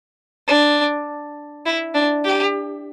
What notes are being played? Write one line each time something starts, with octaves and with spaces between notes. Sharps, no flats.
D4
E4
D4
G4